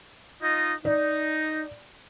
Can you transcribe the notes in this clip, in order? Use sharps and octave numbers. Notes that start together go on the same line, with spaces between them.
D#4 F4 D#5
D#4 D5